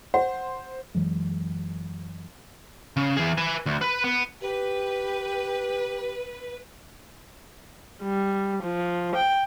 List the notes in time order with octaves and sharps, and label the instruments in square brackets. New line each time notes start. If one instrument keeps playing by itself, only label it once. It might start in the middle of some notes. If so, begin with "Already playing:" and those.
[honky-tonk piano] C5 [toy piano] F#5
[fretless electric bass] F#2 E3 F#3 G#3
[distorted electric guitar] C#3
E3 G#4
B4 G#5
D2
B4
B3
[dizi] G4 [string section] B4
[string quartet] G3
F3
G5